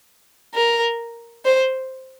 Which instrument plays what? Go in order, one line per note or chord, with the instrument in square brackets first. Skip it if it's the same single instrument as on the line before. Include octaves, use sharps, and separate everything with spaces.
[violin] A#4
C5